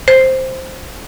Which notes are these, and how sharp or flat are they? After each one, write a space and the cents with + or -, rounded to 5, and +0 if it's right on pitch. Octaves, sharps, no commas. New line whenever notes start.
C5 +0